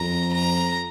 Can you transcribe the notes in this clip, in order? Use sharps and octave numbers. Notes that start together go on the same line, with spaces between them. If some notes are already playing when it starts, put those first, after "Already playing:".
Already playing: F2 A#5
A#5